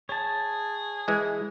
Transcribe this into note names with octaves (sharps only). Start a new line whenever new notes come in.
G#4 C#5 A5
E3 G#3